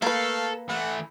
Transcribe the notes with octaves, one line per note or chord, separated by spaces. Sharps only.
A3 A#3 A4 B4 F5
E3 A3 F#5